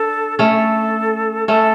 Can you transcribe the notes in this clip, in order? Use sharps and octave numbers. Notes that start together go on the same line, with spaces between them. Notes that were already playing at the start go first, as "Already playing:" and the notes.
Already playing: D4 A4
A3 C#4 A4
A3 C#4 A4